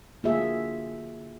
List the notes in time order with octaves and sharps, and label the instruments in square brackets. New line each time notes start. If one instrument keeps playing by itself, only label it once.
[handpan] D3 A#3 F4 F#4 G#4 E5